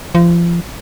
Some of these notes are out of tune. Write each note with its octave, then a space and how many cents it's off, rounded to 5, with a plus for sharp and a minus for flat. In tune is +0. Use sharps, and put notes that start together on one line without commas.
F3 -30